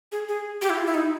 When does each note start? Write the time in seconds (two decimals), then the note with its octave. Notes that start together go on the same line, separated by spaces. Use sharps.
0.12 G#4
0.29 G#4
0.62 G4
0.70 E4
0.78 F4
0.87 E4
0.94 D#4